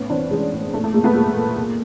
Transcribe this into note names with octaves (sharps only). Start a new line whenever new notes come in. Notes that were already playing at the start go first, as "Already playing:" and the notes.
Already playing: A2 B3 C#4
E3 C4 D4
E3 G#3
A2
A#2 A3
A3
A#2 G#3 A#3
A3 B3
A#2 G#3 A#3
A#2
A#2